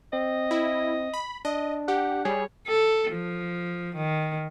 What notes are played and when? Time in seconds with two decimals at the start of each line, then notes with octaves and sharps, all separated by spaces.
0.13 C4 D#5
0.51 E4
1.14 B5
1.45 D4 D#5
1.88 G4 F#5
2.25 G3 G#4 C#5
2.67 A4
3.12 F3
3.95 D#3